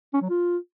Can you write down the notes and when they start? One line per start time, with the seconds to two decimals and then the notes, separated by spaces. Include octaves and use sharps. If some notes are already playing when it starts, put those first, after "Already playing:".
0.14 C#4
0.22 F#3
0.29 F4